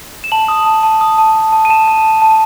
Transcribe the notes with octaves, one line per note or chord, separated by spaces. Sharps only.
E7
A5 F#7
D#6
A5
A5
D#6
A5
A5
A5
D#7
A5 E7
A5
A5
A5